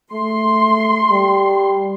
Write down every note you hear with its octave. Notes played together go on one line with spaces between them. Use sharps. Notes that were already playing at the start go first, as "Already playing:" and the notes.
A3 C6
G3